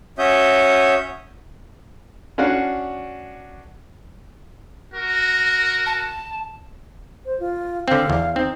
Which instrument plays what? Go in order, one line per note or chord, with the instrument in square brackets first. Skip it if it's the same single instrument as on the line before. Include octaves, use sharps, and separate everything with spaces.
[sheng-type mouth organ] C#4 F#4 C#5 E5 D#6 G6
[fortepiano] C#4 D4 F#4 D5 F5 F#5
[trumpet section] F#4 A#4
[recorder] A5
[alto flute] C5
F4
[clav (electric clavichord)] D3 C4 [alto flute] F5
[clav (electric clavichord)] E2
[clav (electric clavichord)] C4 [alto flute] D#4